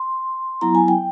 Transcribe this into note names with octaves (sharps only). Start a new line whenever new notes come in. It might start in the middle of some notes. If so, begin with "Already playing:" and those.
Already playing: C6
F#3 B3 E4 A#5
G#5
G5